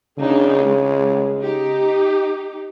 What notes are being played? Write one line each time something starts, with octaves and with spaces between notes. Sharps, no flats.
C#3 D4 D#4 G#4
G#3
D#4 G4